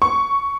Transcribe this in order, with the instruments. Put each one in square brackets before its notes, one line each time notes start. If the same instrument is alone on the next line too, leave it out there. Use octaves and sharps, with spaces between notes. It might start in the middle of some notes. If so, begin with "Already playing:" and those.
[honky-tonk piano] C#6